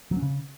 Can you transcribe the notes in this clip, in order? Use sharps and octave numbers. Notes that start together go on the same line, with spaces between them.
F#3
C#4
C#3